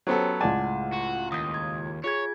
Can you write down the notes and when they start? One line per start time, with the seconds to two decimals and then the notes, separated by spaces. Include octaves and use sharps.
0.07 F#3 B3 C#4 G4 A4 C5
0.41 C#2 A2 G#3 D5 F#5 G#5 A5
0.93 F#4
1.32 D#2 D#6 G6
1.54 G#6
2.04 F4 G#4 C#5 G#6